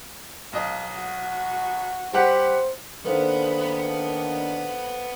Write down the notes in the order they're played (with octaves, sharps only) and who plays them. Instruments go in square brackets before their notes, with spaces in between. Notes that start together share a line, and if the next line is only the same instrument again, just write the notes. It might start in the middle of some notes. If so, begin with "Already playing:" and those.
[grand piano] B1 D#5 [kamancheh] F5
[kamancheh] F#4
[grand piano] G3 G4 F#5 [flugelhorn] C5
[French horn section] D#3 A#3 D4 [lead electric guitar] B3 B4 [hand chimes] A4 C5 F5